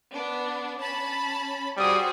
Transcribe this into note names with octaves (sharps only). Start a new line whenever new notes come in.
B3 D4
C#4 A5 B5
G3 F#4 G#4 C5 D#6